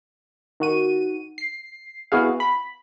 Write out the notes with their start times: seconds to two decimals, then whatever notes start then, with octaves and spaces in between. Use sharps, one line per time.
0.60 D#3 F#4 D#7
1.38 C7
2.12 B3 E4 F#4 G#4 F5
2.40 B5